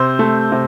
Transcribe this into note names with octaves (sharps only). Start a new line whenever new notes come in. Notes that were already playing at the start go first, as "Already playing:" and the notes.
Already playing: C3 C5
A3
C3